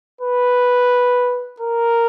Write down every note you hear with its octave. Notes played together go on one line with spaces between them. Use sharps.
B4
A#4